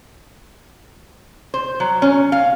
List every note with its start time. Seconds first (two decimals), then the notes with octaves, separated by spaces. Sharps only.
1.54 C5
1.80 F#3
2.02 C#4
2.32 F5